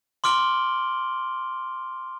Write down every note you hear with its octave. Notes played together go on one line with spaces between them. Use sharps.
C6 D6 F6 D7 F#7 G7